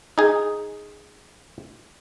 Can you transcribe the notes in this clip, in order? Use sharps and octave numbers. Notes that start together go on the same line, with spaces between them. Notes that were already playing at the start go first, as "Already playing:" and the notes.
D#4 G#4